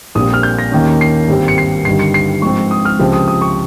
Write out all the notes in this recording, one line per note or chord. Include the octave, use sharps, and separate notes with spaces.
A#1 A#2 G3 C4 D#6
F6
G6
A#6
D#2 D#3 A#3 C#4
C7
G#1 G2 G3 C4
C#7
C7
G1 G2 D#3 G3 C7
C#7
C7
G#2 F3 C4 C#6
D#6
F6
C#2 C3 F3 G#3 C4
D#6
D#6
C#6